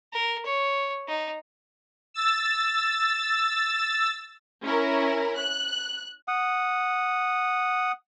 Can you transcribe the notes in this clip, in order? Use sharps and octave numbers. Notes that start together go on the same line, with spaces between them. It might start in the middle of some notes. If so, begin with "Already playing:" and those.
A#4
C#5
D#4
E6 A6
C#4 E4 A#4
F#6
F#5 D#6